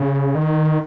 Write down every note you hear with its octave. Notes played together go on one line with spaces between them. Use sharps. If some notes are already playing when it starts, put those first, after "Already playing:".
Already playing: C#3
D#3